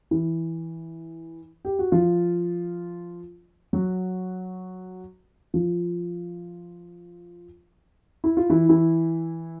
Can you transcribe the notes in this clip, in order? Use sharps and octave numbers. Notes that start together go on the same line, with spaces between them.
E3 E4
G4
F#4
F3 F4
F#3 F#4
F3 F4
E4
F4
E3 E4
E3 E4